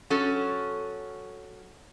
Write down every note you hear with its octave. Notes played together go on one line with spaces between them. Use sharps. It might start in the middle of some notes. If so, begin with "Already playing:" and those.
F#3 C#4 A4